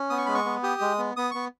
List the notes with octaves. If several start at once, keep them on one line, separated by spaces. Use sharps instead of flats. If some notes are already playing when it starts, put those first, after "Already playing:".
Already playing: C#4
B3 D#6
C#6
G#3 B5
C#6
B3
G4 D#6
G#3
B3
B3 D#6
B3 C#6